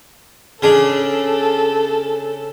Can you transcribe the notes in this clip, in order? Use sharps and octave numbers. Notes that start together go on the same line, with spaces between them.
C#3 D4 A4